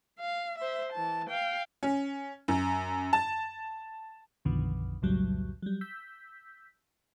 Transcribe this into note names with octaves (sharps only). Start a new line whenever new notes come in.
F5
C5 E5
E3 A5
F5 G5
C#4
F#2
A5
B1 F#2 B2 D3 D#3 F3
B1 E2 A2 C#3 F#3 G3
F#3 G3
E6 G6 B6